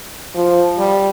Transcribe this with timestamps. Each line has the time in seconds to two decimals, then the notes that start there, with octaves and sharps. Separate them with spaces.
0.35 F3
0.78 G3